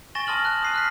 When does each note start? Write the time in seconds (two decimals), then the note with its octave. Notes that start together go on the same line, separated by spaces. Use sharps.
0.15 G#5 C#6 A6 A#6 E7 G7
0.27 A5 C6 D#6 F6 F#7
0.45 F#6 F#7
0.62 D#6 C7 D#7
0.74 F6 F#6 B6